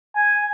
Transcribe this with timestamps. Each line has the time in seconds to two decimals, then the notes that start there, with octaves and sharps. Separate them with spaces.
0.16 G#5